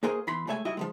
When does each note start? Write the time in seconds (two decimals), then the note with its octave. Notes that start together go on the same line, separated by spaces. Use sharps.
0.03 A#3 F#4 G#4 A#4 C5 D#5
0.27 E2 E4 B5 C6
0.47 G#3 A3 C#5 E5 G#5
0.65 G3 E4 F#4 D#5 E5
0.77 F3 F#3 G#3